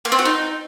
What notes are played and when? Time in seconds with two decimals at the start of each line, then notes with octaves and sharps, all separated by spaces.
0.05 A#3
0.12 C4
0.19 F#4
0.25 D#4